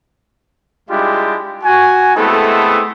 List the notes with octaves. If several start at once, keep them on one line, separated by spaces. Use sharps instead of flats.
G3 G#3 D4 E4 F4 G4
F#4 G#5
G#3 A3 B3 C4 E4 A4